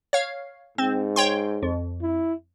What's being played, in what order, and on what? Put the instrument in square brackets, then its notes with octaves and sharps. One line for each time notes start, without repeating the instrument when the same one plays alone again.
[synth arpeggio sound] C#5 F5
[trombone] G#2 [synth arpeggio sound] C4
[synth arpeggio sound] C#5 G5 C6
F2
[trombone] E4